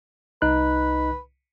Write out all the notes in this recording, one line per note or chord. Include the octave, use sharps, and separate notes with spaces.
C2 D#4 B4 F#6